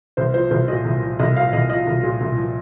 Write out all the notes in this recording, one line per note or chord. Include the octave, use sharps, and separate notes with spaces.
C2 C5
F3 C5
C2 C5
A#2 D#5
C2
F3
C2 D#5
A#2 F5
C2 D#5
F3 D#5
C2
A#2
C2
F3